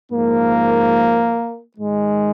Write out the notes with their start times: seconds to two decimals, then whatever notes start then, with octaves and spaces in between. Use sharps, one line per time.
0.11 G#2 F3 A#3
1.77 G#2 D#3 G#3